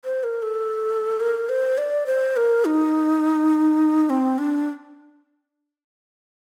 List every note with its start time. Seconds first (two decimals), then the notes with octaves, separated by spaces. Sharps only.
0.05 C5
0.24 A#4
0.42 A4
1.20 A#4
1.49 C5
1.78 D5
2.06 C5
2.37 A#4
2.65 D#4
4.10 C4
4.38 D4